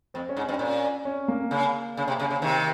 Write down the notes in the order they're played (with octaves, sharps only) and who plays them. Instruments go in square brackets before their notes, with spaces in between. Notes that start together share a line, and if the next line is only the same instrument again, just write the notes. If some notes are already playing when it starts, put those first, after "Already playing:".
[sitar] F2 [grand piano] C4
[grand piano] C#4
[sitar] G#2
[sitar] G2 [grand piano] C#4
[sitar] A#2 [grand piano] C#4
[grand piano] C#4
A#3
[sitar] C#3
C#3
C3
C#3
C#3
[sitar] C3 D#3 [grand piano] C4